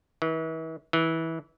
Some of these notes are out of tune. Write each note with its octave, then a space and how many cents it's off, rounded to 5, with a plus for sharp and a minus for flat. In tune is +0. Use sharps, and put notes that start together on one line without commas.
E3 -40
E3 -20